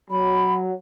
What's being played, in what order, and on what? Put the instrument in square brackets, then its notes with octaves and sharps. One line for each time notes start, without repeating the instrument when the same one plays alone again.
[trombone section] F#3 [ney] B5